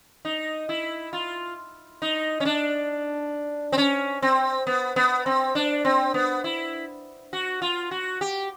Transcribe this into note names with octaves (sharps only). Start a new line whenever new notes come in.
D#4
E4
F4
D#4
C#4
D4
C4
C#4
C4
B3
B3
C4
D4
C4
B3
E4
F#4
F4
F#4
G4